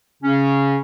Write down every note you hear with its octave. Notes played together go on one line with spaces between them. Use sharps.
C#3 C#4